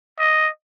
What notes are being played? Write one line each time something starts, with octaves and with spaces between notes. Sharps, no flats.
D#5